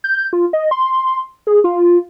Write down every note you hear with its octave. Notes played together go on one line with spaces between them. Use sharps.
G6
F4
D#5
C6
G#4
F4